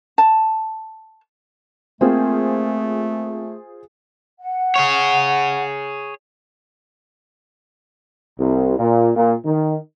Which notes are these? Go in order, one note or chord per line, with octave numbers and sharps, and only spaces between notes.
A5
A3 A#3 C4 F4 G#4 C5
F#5
G#4 C#5
C2
A#2
A#2
D#3